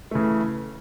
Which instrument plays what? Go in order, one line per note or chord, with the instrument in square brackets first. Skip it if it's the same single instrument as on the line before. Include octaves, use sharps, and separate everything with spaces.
[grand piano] C#3 E3 A3